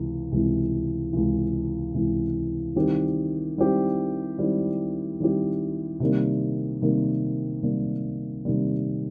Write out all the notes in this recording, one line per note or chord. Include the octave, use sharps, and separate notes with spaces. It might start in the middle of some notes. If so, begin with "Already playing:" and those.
Already playing: C#2 C3 E3
C#2 C3 E3
C#2 C3 E3
C#2 C3 E3
D#3 G3 C4 E4 G4
D#3 G3 C4 E4 G4
D#3 G3 C4 E4 G4
D#3 G3 C4 E4 G4
C3 D#3 G3 A#3
C3 D#3 G3 A#3
C3 D#3 G3 A#3
C3 D#3 G3 A#3